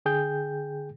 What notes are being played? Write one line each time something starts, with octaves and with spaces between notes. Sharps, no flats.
D3 G#4 G5 G6